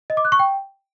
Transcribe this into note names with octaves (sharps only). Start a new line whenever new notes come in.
D#5
D6
F#6
C#6
G5